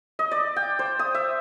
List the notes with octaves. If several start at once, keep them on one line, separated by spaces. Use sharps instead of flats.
D#5
D5
G5
C5
D#6
E5